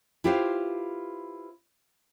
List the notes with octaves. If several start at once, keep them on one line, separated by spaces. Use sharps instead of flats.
E4 F4 G4 B4 C5 F5